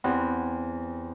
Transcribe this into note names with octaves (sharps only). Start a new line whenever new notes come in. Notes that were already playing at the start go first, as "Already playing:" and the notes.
E2 C4 G4 F#6